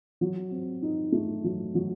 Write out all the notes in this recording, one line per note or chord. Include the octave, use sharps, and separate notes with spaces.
F#3
C4
D#4
A3
F#3
F#3